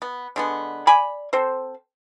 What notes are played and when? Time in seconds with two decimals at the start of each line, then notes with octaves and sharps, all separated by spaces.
0.02 B3
0.36 D3 G#3 B3
0.87 D5 G#5 B5
1.33 C4 A4 C5